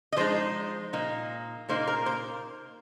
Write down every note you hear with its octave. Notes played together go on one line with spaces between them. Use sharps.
D#5
F3 G#3 D#4 C5
A#2 A#3 D#4
A#2 A#3 D#4 C5
A#4
C5